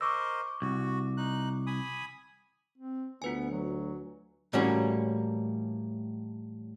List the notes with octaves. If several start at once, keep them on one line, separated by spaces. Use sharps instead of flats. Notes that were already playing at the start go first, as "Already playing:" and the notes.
A#4 C5 D#5 C#6 D6 E6
C2 F#4
D#4 F#6
G#5 B5 D#6
C4
D2 B3 F4 B4 G#5
F#3
A2 E3 G3 A#3 C#4 F#4